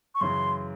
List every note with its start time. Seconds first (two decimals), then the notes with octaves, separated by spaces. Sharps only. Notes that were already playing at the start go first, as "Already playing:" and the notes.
0.15 C#6
0.21 F#2 C#3 E3 C6